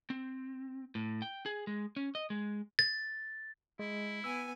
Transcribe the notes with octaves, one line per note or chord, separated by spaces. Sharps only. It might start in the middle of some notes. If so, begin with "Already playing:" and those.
C4
A2
G5
G#4
G#3
C#4
D#5
G#3
A6
G#3 E4
B3 G#5 E6